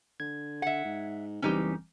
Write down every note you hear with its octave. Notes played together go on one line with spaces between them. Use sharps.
D3 G#6
E5 F#5
G#2
F#1 E3 G3 C4 C#4 D#4 G4